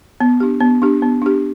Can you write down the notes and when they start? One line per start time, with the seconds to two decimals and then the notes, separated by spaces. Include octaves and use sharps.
0.20 B3
0.40 D4 G4
0.60 B3
0.82 D4 G4
1.02 B3
1.22 D4 G4